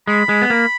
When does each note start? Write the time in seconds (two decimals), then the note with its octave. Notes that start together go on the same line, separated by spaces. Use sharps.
0.07 G#3 B5
0.29 G#3
0.42 B3
0.50 A#3